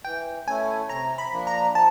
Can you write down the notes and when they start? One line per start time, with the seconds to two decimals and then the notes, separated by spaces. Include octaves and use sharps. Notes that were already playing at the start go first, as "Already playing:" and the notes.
0.05 E3 G5
0.47 A3 C#4 E4 G#5
0.89 C3 A#5
1.18 B5
1.33 F3 A#3 D4
1.47 A#5
1.75 F3 A5